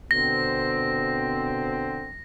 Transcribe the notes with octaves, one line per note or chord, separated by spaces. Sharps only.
B2 D3 C4 A#6